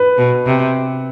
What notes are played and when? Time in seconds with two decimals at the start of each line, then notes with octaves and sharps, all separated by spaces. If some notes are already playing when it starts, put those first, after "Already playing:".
Already playing: B4
0.18 B2
0.46 C3